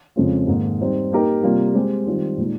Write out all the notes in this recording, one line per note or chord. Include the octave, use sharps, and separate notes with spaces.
F2 C#3 G#3 C4 F4
G#2 D#3 A#3
G3 C4 D#4
A#3 D#4 G4 A#4
C3 G3 A#3 F4
G#3 C4 G4
D#3 G3 C4 F4
A#2 G#3 D#4